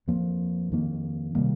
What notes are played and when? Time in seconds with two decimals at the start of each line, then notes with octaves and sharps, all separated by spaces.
0.07 F2 F3 A#3
0.72 F2 D#3 A#3
1.35 C3 D#3 G3 A#3